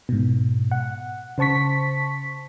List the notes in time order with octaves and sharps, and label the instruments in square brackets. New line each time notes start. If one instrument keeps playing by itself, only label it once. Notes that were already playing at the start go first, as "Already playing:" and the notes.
[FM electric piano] G#2 B2
F#5
C#3 C5 A5 C#6 B6